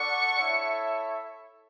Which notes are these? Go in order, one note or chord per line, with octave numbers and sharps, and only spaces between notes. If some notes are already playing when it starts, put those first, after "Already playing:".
Already playing: D4 A4 D5 F#5 C#6
E4 A4 C#5 E5